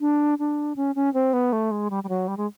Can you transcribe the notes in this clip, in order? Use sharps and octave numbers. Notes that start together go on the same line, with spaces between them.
D4
D4
C#4
C#4
C4
B3
A3
G#3
G3
G3
F#3
G3
G#3